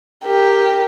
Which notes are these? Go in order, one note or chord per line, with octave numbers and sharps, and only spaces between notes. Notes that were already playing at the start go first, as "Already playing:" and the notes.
G4 A#4